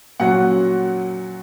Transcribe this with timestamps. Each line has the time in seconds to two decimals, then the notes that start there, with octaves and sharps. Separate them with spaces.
0.20 A#2 F#3 C#4 F#5